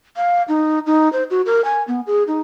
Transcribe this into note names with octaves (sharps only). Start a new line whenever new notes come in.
F5
D#4
D#4
C5
F#4
A#4
G#5
B3
G#4
D#4